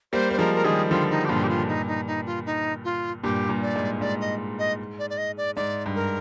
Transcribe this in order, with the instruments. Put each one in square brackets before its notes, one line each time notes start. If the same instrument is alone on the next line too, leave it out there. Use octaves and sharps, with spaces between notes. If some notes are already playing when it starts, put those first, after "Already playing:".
[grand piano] G3 A#3 [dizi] C5
[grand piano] A#3 [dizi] C5
[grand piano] F3 G#3 [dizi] A#4
[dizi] A#4
[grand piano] D#3 G3 [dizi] G#4
[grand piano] D3 F3 [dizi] F4
[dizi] D#4
G4
[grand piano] G2 A#2 [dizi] F4
[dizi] G4
F4
D#4
D#4
D#4
F4
D#4
F4
[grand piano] G2 A#2 [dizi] G4
[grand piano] G2 A#2
[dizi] D5
[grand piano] G#2
[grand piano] G#2 [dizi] D5
[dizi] D#5
D#5
D5
D5
D#5
D5
[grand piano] G#2 [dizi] D5
[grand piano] G2
[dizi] A#4